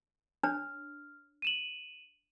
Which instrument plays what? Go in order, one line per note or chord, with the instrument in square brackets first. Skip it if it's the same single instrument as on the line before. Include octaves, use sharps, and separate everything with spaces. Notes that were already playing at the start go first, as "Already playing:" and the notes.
[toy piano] D4 C#5 [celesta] F6
[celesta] D#7 E7 F#7